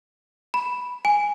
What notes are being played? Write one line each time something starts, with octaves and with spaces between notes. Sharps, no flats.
B5
G#5